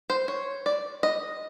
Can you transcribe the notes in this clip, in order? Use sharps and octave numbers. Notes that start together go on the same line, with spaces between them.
C5
C#5
D5
D#5